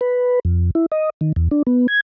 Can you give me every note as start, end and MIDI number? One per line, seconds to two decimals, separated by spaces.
0.01 0.40 71
0.45 0.71 41
0.75 0.86 64
0.92 1.10 75
1.21 1.32 51
1.36 1.48 40
1.51 1.62 62
1.67 1.87 59
1.88 2.00 92